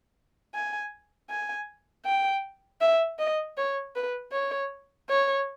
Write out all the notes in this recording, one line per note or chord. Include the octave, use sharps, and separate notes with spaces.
G#5
G#5
G5
E5
D#5
C#5
B4
C#5
C#5